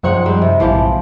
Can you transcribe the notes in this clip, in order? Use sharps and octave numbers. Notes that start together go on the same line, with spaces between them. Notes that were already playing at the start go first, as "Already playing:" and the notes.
F#2 C#3 F3 D#4 C5 F#5
G3 G#3 C4
C3
A#1 G#2 E3 F3 G4